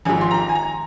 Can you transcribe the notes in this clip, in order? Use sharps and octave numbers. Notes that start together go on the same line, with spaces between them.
G#1 G#2 F3 G#5
C6
A#5
G#5
A#5